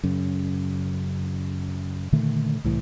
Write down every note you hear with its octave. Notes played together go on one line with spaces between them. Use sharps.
F#2 C#3
A#2 D3 D#3 A3
C2 A2 E3